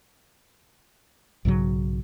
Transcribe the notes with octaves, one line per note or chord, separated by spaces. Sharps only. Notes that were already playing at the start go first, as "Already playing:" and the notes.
B1 G#2 C#3 F#3